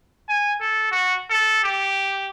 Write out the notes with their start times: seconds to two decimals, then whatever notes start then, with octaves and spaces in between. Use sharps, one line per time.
0.28 G#5
0.61 A4
0.92 F#4
1.30 A4
1.64 G4